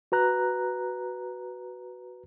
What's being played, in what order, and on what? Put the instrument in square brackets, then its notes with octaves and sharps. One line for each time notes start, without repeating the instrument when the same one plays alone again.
[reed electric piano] F#4 B4 A#5 F#6